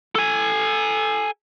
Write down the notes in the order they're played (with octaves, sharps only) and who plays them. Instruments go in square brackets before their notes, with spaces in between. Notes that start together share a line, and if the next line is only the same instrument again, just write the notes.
[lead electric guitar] A4 G#5